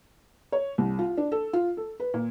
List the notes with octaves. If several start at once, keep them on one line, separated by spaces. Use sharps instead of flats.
C#5
C2
F4
D4
A4
F4
A4
B4
A#2